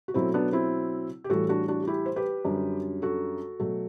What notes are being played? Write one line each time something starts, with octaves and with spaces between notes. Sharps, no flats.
F#4
B2 F#3 A3 C4 E4
B3 D4
C4 E4
G4
A2 E3 G3 F#4 A4
D4 F#4
D4 F#4
F#4
E4 G4
C5
G4 B4
F#2 D3 G3
F#4 A4
B2 F#3 A3